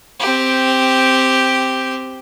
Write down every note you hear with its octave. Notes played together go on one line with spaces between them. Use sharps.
C4 G4